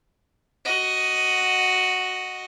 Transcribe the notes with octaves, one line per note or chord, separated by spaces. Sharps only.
F#4 D#5